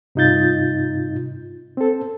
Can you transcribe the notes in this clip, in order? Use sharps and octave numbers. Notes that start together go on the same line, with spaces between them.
G2 C3 D#4 F4 G6 A6
C4 A4